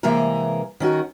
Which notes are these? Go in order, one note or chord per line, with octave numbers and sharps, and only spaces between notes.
C3 E3 G#3 A#3 G#4 A#4
D#3 C#4 F#4 A#4